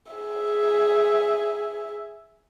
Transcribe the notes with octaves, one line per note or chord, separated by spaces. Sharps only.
G#4 E5